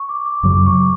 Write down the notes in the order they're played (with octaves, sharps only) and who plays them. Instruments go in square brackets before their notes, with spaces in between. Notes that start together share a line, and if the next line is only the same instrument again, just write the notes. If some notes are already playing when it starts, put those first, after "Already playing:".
Already playing: [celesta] C#6
D6
D6
[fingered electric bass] F#2 C#3 F#3 [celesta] D6
[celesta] C#6